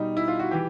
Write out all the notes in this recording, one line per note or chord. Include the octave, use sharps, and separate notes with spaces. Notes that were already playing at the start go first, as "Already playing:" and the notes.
Already playing: B2 G3 D#4
E4
F4
F#4
E3 G4